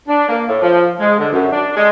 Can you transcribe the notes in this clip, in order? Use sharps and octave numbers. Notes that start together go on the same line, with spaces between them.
D4
A#3
A2
F3
G#3
D3
F#2
D4
G#3